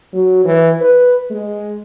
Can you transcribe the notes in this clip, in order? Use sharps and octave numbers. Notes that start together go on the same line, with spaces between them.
F#3
E3
B4
G#3